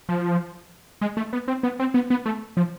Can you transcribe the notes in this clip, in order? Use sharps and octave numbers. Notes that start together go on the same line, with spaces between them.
F3
G#3
A3
B3
C4
B3
C4
B3
B3
A3
F3